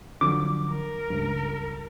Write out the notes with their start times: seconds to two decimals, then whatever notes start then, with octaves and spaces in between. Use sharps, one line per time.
0.21 D3 F3 F#3 D6
0.70 A#4
1.10 C#2 G2